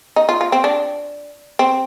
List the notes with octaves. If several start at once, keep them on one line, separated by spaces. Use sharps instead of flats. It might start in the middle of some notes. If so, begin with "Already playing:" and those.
D#4
F4
F4
C4
D4
C4